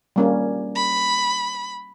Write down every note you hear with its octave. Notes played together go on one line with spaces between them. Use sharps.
G3 A#3 C#4
B5